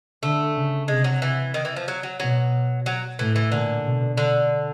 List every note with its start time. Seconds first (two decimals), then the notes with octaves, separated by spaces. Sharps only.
0.23 D3 A3
0.56 C#3
0.88 C3 G#3
1.04 F#3
1.22 E3
1.54 D#3
1.65 E3
1.76 F3
1.88 F#3
2.03 F#3
2.20 B2 F#3
2.86 F#3
3.19 A2 E3
3.36 E3
3.52 A#2 D3
3.84 B2
4.17 D3